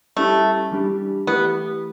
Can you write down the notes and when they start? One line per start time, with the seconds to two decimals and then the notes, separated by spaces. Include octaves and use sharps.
0.16 G3 A3 C#4 E4 G4
0.71 E3 G3 D4 G4
1.27 E3 A3 B3 E4 G4